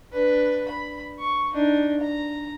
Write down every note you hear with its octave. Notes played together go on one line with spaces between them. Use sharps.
D4 B4
B5
C#6
D4 D#4
A#5